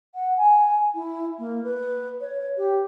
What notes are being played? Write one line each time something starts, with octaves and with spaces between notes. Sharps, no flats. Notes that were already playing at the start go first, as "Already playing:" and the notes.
F#5
G#5
E4
A#3
B4
C#5
G4